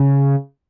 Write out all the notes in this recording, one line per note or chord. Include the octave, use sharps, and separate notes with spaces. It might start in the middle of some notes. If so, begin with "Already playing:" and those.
Already playing: C#3